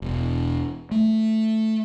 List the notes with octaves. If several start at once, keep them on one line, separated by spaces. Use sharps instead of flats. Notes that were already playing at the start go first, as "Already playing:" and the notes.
E1
A3